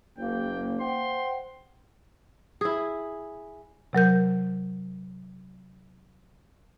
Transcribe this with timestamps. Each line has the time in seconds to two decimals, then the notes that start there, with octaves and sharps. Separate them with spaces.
0.18 F#1 A#3 G5
0.81 C5 F#5 G5 C6
2.61 E4 G#4
3.93 C3 F#3 A#4 G6